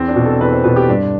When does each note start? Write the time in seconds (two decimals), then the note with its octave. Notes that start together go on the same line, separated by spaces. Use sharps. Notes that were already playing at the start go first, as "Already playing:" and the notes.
Already playing: E2 C4
0.08 D4
0.16 B2
0.25 A4
0.41 E2 B4
0.53 C5
0.64 B2 B4
0.76 G4
0.89 G2 D4